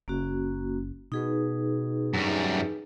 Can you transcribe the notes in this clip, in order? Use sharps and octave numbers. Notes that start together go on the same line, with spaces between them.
F#1 A#3 C#4 F#4
B2 D#4 G#4 B4
F#2 G3